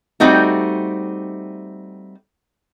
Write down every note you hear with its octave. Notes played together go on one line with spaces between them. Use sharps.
G3 A3 C4 D#4 F#4